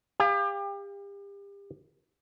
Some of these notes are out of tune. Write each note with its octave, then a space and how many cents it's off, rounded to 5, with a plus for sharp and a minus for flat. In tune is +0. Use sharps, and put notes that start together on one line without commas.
G4 +35 F5 +0